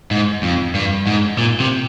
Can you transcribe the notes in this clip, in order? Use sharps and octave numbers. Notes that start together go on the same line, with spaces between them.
G#2
F2
G2
G#2
A#2
C3